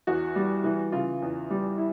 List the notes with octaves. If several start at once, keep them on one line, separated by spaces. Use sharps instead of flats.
E2 F#4
G3
E3
C#3 F4
E2
G3
E4